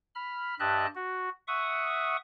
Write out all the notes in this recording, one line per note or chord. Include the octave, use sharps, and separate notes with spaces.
B5 F6
G2 G4 D#5 E5 A5 F#6
F#4
E5 F#5 C#6 D#6